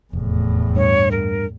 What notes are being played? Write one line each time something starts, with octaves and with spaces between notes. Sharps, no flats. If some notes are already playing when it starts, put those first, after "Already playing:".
F1 E2 A2
G2 C#5
A#4